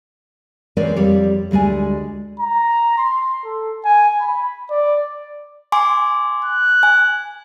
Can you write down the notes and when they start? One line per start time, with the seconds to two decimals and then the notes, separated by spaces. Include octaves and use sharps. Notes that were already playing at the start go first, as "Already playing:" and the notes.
0.77 E3 G#3 C4 C#4 A#4 D5
0.96 F2 G3 C4 C#5 D5
1.51 D2 G3 G#3 D5 G#5
2.40 A#5
2.98 C6
3.45 A4
3.84 G#5
4.20 B5
4.70 D5
5.72 G#5 C6 D6
6.45 F#6
6.83 G#5